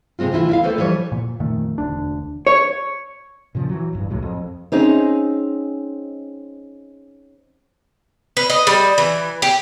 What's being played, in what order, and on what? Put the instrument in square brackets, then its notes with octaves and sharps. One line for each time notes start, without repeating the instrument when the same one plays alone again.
[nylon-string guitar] A2 C3 G#3 C4 F4
D2 C3 E3 E4 F4
E4 E5 F5
D#2 A3 A#3 A4 B4 C5
E3 F3 G3 C#5
[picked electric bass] A#2
F2 A#2 D#3 A3
E1 D2 D4
[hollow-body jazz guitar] C#5
[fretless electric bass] A#2 C#3 F3
E3 F#3
D1 G2
C2 A2 F#3 G#3
F2
[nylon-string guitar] C4 C#4 D#4 G#4
[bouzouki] B4
D#5
G3
E3
G4